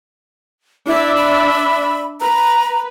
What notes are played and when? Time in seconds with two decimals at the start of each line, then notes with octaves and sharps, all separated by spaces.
0.87 D4 E4 D5 E5
1.17 B5
2.21 B4 A#5